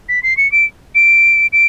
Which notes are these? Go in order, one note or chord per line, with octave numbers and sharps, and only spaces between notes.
B6
C7
C#7
D7
D7
D7